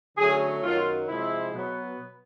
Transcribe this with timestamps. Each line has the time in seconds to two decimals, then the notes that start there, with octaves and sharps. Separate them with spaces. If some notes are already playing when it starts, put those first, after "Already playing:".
0.18 D3 F#3 A3 C#4 G#4
0.63 F#2 D#3 F#3 F4
1.09 C3 F3 G#3 E4
1.54 B2 F#3 B3